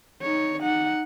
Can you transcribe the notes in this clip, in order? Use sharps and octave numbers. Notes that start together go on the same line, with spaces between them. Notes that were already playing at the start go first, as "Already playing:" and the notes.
D#4 C#5
D#4 F#5